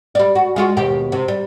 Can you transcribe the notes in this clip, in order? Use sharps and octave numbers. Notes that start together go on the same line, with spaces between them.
G3 D5
F#4
G#3 F4 F#4
D#2 B2 G4
C3
G3